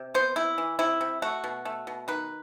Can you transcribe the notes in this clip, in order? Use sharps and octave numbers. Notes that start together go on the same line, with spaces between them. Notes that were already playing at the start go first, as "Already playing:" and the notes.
Already playing: C3
B3 C5
C3 E4
E3
C3 E4
C3
A3 F#4
B2
A3
B2
D#3 B4